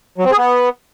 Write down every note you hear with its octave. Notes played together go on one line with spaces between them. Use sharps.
F#3
C4
G#4
B3